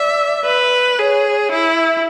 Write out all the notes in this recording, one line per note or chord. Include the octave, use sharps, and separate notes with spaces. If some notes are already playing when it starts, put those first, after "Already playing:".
Already playing: D5 E5
B4
G#4 C#5
E4 E5